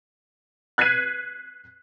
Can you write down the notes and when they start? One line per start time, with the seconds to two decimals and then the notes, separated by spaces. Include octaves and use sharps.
0.78 F#6 G#6 B6 C7 D#7